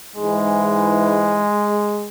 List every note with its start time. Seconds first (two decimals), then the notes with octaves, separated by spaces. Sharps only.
0.16 G#2 E3 G#3